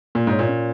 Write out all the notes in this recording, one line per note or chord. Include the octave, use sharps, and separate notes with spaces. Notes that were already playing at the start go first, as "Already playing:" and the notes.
A#2 A#3
G#2 C#5
A#2
C#4